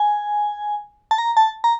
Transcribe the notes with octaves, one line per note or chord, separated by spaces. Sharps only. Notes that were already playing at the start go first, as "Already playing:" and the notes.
Already playing: G#5
A5
A#5
A5
A#5